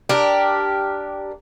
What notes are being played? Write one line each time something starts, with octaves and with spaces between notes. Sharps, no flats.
D4 G4 A#4